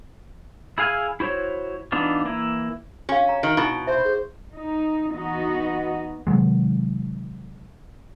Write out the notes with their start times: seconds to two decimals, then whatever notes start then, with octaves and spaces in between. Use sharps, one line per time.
0.78 E4 G#4 F5 G#5 F6
1.20 E4 F#4 C5 C#5
1.92 E3 B3 D4 D#4 F4
2.26 E3 A#3 E4
3.09 C#4 F#4 F5
3.29 A#5
3.43 D#3 F#4
3.57 B2 D#4 E4 A#5
3.87 C5 E5
4.05 G#4
4.53 D#4
5.14 E3 B3 D#4 F#4 D#5
6.27 C3 D#3 F#3 G#3